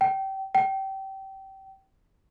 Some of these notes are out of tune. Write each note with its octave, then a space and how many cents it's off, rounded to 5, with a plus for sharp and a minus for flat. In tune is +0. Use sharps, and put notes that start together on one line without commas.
G5 -25
G5 -25